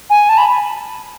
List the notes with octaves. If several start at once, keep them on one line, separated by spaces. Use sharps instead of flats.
G#5
A5
B5